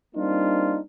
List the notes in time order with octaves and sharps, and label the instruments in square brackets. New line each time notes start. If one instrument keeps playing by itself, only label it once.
[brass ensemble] G3 A#3 C4 D4 D#4 F4